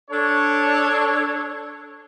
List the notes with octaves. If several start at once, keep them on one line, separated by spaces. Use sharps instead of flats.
D4 A4 C#5